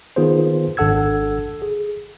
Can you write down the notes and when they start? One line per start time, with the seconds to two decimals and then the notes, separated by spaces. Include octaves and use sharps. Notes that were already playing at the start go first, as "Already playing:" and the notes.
0.16 D#3 B3 F4 G#4 B4 C5
0.77 G#1 D4 A4 F#5 E6 G#6
1.62 G#4